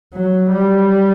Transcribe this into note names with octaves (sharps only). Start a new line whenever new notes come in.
F#3
G3